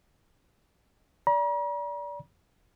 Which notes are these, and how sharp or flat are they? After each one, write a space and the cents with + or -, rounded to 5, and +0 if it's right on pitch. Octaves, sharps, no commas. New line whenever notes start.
D5 -20 A#5 +45